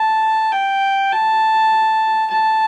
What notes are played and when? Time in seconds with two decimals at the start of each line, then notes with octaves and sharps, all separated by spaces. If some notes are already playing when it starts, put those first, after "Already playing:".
Already playing: A5
0.52 G5
1.12 A5
2.31 A5